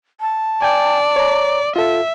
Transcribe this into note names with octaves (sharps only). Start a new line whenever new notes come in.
A5
D5 G5 G#5
C#5 A#5
F4 A4 E5